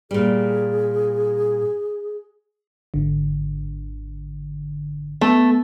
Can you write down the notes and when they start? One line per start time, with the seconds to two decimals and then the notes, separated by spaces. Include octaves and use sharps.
0.11 A#2 G3 G#4
2.94 G#1 D3
5.21 A3 B3